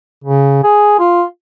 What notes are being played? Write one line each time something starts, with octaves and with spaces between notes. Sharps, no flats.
C#3
G#4
F4